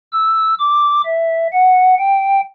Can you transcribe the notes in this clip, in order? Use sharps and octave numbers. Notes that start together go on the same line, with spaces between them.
E6
D6
E5
F#5
G5